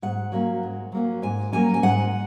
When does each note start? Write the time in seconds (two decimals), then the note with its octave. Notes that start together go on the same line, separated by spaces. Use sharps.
0.02 G#2 F#5
0.32 F#3 A#3 C#4
0.63 G#2
0.92 F#3 A#3 C#4
1.22 G#2 G#5
1.52 F#3 A#3 C#4 G#5
1.74 G#5
1.83 G#2 F#5